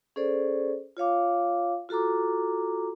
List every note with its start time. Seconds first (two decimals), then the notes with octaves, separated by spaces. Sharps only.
0.16 C#4 G#4 A4 C5 D5
0.97 F4 C#5 F5 D6
1.89 F4 F#4 A4 A#5 D6